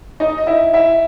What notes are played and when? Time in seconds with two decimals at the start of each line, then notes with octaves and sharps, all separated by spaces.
0.20 D#4 D#5
0.38 D#5
0.47 E4 E5
0.73 E4 E5